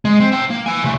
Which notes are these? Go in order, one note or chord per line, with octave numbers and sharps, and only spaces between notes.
G#3
C4
E5 G5
A#3
E5 G#5
C2 A3